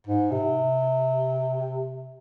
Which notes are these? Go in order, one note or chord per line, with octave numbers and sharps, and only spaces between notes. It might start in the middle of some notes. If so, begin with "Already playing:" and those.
G#2
C3